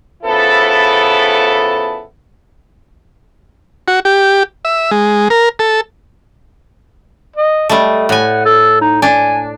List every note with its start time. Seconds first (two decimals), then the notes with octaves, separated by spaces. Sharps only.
0.23 C#3 F3 B3 E4 A4
3.88 F#4
4.05 G4
4.65 E5
4.91 G#3
5.30 A#4
5.59 A4
7.36 D#5
7.69 G3 A3 D#5
8.09 A2 F#5 G#5
8.45 A4
8.81 D#4
9.02 D4 G#5